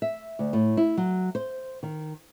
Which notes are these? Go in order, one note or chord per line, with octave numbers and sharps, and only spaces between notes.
E5
D2
A2
E4
F#3
C5
D#3